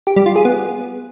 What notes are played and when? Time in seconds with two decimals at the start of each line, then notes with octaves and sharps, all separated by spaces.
0.07 G4
0.16 G3
0.26 F4
0.36 G#4
0.45 B3